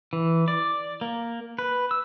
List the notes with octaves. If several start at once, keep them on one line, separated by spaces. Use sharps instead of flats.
E3
D5
A#3
B4
E6